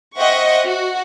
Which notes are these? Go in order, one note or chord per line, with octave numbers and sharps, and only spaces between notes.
C5 D#5 E5 F#5 G5 C#6
F#4